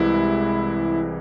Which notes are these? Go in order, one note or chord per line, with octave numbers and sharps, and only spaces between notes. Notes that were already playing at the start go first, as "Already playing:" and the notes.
Already playing: C2 C3 E3 G#3 E4